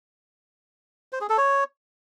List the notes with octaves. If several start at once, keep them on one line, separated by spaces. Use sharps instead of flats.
C5
G#4
A4
C#5